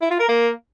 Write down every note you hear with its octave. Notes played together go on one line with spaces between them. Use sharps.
E4
F4
A#4
A#3